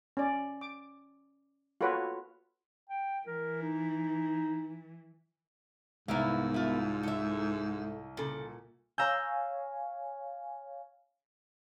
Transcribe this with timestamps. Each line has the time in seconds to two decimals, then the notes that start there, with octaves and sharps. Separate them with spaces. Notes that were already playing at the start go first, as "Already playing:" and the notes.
0.17 C#4 D5
0.61 D6
1.81 F4 F#4 A4 B4 C#5
2.89 G5
3.26 E3 A#4
3.62 D#4
6.08 C2 G#2 B3 E4 A#4 F5
6.54 E4 F4
7.03 A4 E5
8.17 A#2 C#3 A4
8.98 C#5 F5 G#5 A#5 E6 G6